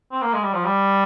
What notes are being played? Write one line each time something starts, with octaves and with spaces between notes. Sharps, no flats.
C4
A#3
G#3
G3
F3
G3